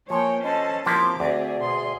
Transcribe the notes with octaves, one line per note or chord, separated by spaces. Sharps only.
F3 A#3 C#5 G5 G#5
C#4 A4 C5 D#5 A5
F3 A#3 C4 E4 G4 C6 D6
D2 G#4 D5
B2 G#4 C6